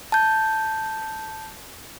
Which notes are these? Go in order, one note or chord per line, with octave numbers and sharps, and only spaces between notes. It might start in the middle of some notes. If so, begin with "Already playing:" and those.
A5 G6